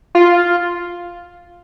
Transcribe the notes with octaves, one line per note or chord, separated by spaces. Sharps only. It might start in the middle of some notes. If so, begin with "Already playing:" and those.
F4